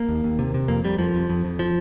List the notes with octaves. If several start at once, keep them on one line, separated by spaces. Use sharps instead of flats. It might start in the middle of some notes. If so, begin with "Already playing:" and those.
Already playing: A#3
D#2
D#2
C3
C3
F2 A#3
F2 G3
F2 F3
F2
F2
F2
F3